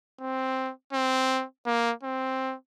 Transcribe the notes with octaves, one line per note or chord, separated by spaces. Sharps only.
C4
C4
A#3
C4